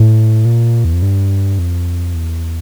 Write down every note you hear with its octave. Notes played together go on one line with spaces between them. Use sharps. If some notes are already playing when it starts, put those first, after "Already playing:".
Already playing: A2
A#2
E2
F2
G2
F2
E2